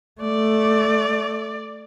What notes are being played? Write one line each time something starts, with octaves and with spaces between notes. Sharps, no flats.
A3 D5